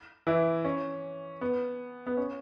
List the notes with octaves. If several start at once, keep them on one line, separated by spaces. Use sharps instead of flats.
E3 E4
C#4
B3
B3
C#4